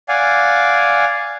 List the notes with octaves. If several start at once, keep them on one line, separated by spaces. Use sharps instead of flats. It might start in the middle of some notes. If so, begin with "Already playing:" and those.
D5 F5 F#5 G#5